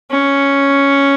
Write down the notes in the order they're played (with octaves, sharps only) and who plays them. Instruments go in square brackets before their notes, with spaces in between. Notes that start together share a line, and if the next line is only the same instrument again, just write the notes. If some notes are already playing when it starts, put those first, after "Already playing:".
[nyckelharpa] C#4